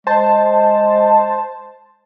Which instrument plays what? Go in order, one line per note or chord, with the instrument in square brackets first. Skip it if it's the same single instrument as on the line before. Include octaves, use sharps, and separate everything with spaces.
[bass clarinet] G#3 [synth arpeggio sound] C5 A5